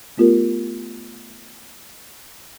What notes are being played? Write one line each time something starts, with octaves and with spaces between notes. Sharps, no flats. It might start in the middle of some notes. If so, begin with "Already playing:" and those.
A3 B3 F4 G4 A#4